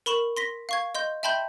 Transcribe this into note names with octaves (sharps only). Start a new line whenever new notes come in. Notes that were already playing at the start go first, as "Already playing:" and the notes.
A#4 B5 C#6 E7 F#7
C6 A#6 B6
F5 C#6 G#6
D#5 C6 G6
E5 G5 A5 B5 C6 G6